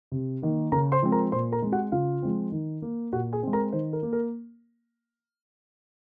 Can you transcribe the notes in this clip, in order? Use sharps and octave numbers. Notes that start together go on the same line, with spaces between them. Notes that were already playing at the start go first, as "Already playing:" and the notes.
C3
D#3 A#3
C#3 A#4 A#5
C5 C6
F3 G#3 C4
A#4 A#5
A#2 C5 C6
A#4 A#5
G#3 C4
F#4 F#5
C#3 F4 F5
F3 G#3 C4
D#3
A#3
A#2 F#4 F#5
G#4 G#5
G#3 C4
A#4 A#5
D#3 C5
A#4
A#3
A#4